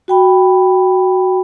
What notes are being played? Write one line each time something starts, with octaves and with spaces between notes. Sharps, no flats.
F#4 G5 B5